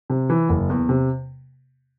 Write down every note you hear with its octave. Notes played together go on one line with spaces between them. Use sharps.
C3
E3
F#1
E2
C3